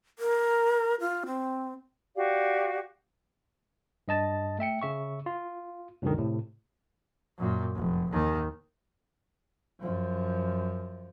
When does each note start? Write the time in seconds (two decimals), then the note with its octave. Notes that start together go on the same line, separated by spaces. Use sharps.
0.19 A#4
1.00 F4
1.26 C4
2.15 F#4 G4 D5 F5
4.08 G2 D#5 A5 A6
4.59 A3 E5 G5 C#7
4.82 C#3 E5 C#6
5.26 F4
6.02 C#2 F#2 B2 D3 D#3
6.18 A2 C3
7.38 F#2 A#2
7.75 F1
8.11 D#2 D#3
9.81 F#2 F3